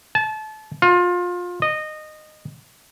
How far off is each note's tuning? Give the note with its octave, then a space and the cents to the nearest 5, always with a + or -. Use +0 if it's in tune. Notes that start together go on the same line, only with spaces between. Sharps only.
A5 -30
F4 +25
D#5 -15